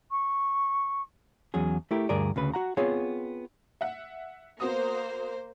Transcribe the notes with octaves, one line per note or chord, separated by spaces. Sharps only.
C#6
E2 F#3 C#4 G#4
A3 E4 G4 A#4
D2 G2 G#4 A#4 D5
D2 C#3 B4
F#4 F#5 A#5
B3 C4 F4 G#4 C#5
E5 F#5
A#3 B3 F#4 C5 D#6